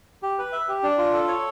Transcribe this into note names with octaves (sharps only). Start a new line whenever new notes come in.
G4
B4
E5
G4
D4
F4
A4
C#5